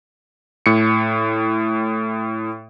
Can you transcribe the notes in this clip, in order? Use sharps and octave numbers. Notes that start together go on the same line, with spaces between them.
A2 C#7